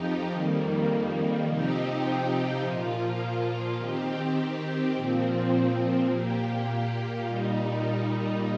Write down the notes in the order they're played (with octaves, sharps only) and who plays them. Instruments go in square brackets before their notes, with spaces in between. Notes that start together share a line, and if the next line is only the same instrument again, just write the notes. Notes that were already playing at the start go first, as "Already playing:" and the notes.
Already playing: [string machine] F2 F3 D#4 G4
F2 D#3 G3 A#3
C3 F3 C4 D#4 G4
A#2 F3 A#3 F4
D#3 C4 G4
A#2 F3 C4
A#2 A#3 G4
A#2 G3 D#4